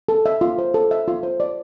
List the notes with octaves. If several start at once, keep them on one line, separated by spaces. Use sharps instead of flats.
A4
E5
F4
C5
A4
E5
F4
C5
D5